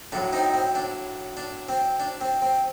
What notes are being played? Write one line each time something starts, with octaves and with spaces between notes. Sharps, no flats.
A2 F#3 D4
C4 D#4
C4
D4
D4
C4
D4
C4
C4